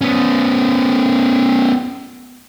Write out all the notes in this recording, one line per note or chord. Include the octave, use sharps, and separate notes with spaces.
B3 C#4